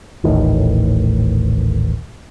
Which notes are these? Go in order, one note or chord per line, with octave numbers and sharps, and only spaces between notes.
D#1 A1 A2 D#3